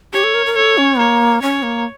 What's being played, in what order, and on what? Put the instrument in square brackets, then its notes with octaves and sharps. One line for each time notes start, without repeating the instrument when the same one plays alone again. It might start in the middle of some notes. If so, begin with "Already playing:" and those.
[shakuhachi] G4 [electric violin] C#5
[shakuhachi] A4
A#4
A#4
[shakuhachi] A4 [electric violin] C#5
[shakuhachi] C#4
[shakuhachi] A#3 [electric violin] C#5
[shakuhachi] C#4 [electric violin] C#5
[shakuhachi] A#3